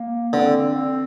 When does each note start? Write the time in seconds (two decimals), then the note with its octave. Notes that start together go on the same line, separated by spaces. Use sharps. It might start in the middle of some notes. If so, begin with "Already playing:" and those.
Already playing: A#3
0.33 D3 C4